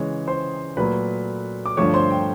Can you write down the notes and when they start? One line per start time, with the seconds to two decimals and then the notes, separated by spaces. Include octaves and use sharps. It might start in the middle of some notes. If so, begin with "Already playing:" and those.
Already playing: C#3 E3 G#3 C#5
0.28 C5 C6
0.77 A#2 F#3 A3 B4 B5
1.66 D6
1.77 G2 D3 F3 A3 C#5 C#6
1.94 C5 C6
2.11 G5